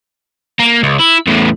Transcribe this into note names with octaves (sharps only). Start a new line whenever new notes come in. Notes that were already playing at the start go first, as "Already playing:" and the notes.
A#3
C#2
E4
E2 A2